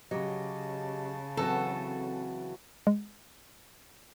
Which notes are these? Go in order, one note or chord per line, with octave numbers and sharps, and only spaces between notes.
C#3 F#3 G4 D#5 A5
E3 F#3 C4 F#4 A4
G#3